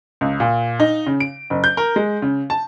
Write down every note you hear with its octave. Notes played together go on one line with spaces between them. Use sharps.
C#2
A#2
D#4
C#3
D7
F#1
G6
A#4
G#3
C#3
A5